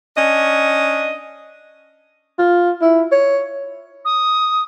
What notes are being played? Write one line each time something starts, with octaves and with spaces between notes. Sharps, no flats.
C#4 D4 D#5
F4
E4
C#5
D#6